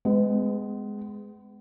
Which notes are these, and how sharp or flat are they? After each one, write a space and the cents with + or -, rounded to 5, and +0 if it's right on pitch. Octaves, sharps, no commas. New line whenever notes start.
G#3 +0 B3 +35